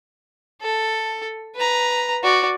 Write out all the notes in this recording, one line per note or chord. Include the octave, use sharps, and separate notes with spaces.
A4
B4 A#5
F#4 D5